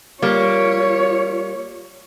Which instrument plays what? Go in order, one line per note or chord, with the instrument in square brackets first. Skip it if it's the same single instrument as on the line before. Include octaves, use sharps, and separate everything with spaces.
[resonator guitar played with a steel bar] G3 A#3 [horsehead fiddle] F4 C#5